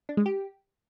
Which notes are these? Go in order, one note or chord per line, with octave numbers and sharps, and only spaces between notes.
D4
G#3
G4